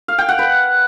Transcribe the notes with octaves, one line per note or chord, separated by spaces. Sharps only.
F5
G5
F#5
B4